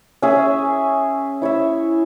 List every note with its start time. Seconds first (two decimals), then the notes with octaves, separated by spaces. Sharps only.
0.22 C#4 G#4 E5
1.42 E4 C#5 E5